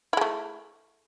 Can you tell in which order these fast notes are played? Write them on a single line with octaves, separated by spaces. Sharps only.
E4 G#3 A3